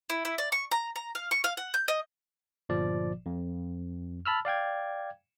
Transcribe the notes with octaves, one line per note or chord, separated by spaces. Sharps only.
E4
E4
D5
C#6
A#5
A#5
F5
C#6
F5
F#5
G6
D#5
G1 A#2 F3 D5
F2
A5 B5 E6 F6
D5 F5 G5 G#6